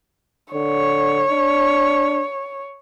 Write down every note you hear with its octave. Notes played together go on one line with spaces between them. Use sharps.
D3 C#5
D4